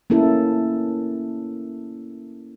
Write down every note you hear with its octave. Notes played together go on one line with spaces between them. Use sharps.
A#3 C#4 E4 A4